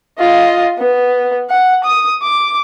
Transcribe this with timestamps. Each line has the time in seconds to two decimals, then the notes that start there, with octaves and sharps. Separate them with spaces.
0.18 F4 D#5
0.78 B3
1.50 F#5
1.84 D#6
2.22 D6